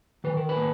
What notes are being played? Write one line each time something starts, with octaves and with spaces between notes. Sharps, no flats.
D#3 B4
A#4
B4
A#3